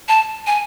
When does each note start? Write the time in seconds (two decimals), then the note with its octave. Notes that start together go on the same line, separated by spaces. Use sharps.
0.09 A5
0.47 G#5